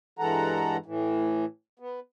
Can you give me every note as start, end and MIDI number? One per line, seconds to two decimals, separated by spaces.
0.19 0.77 43
0.19 0.77 52
0.19 0.77 56
0.19 0.77 69
0.19 0.77 78
0.19 0.77 82
0.86 1.45 45
0.86 1.45 52
1.79 2.00 59